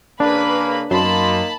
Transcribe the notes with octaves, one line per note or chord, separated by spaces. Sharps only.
C#3 A#3 D4 B4 B5
F#2 F#3 A#3 D#4 A5 B5 C6